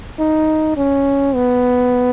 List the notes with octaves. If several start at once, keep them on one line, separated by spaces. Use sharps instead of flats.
D#4
C#4
B3